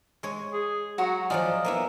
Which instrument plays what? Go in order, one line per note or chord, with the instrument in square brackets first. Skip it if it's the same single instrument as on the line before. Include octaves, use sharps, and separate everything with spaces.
[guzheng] G#3 C#5
[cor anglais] G#4
[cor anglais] F#3 [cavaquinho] F#4 A#5
[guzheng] F3 F#3 F4 [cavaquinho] G#4 D5 [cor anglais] D#5
[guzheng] A#3 B3 E4